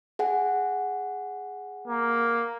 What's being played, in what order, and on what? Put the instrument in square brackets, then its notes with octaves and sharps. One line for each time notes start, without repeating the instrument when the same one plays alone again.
[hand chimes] G#4 F#5 G#5
[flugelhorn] A#3